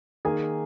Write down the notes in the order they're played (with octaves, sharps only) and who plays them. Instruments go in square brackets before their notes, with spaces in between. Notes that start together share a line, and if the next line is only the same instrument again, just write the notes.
[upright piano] D#3 A#3 G#4 G#5